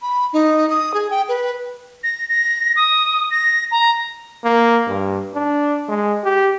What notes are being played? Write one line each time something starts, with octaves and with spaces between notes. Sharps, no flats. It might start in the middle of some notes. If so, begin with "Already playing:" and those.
B5
D#4
D#6
G#4
G5
B4
A#6
A#6
D#6
A#6
A#5
A#3
G2
D4
G#3
G4